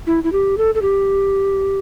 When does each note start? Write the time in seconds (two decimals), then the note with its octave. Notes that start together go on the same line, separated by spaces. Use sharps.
0.07 E4
0.24 E4
0.32 G4
0.58 A4
0.75 A4
0.82 G4